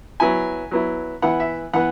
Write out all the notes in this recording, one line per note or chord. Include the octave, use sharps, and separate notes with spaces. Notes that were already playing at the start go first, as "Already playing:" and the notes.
F#3 B3 E4 G#5
F#3 B3 E4
E3 B3 E4 F#5
E5
E3 B3 F#5